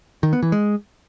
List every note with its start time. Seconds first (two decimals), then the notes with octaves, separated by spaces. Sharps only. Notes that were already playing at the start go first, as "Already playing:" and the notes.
0.23 D#3
0.33 B3
0.43 E3
0.52 G#3